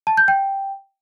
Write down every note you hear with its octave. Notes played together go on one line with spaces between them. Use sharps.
A5
G6
G5